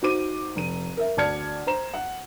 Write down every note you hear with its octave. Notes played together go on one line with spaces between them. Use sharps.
D#4 F#4 C5 D6 D#7
F1 D#7
A#4 E5
D2 D5 A5 F6 G#6 C#7
C5 A#5 E7
F#5